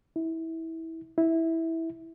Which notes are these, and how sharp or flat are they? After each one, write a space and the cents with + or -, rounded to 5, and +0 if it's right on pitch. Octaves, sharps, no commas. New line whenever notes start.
E4 -20
E4 -10